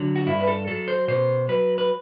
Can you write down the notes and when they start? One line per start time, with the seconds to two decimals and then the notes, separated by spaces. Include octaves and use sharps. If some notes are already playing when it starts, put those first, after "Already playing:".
Already playing: D3 F#3
0.16 F#4
0.26 G2 E4
0.40 B4
0.47 A4
0.67 F#3 A4
0.88 C5
1.08 B2 C5
1.49 F#3 B4
1.78 B4